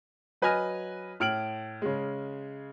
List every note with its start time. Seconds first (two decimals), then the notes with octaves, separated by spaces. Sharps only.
0.42 F#3 B4 D#5 G#5 F6 A#6
1.20 A2 F6 D7 F#7
1.82 C#3 G#3